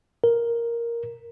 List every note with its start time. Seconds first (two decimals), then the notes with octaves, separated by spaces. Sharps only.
0.24 A#4